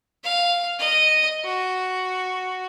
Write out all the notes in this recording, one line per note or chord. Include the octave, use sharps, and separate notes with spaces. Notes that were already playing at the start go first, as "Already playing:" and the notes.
F5
D#5
F#4